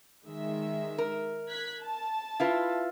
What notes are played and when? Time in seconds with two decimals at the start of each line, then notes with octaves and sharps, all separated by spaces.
0.25 D#3 G#3 E5
0.98 A#4
1.49 F#6 G#6 B6
1.83 A5
2.40 E4 F4 B4